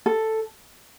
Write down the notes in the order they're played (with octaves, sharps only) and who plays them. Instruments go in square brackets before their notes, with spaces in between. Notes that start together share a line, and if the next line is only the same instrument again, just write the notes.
[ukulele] A4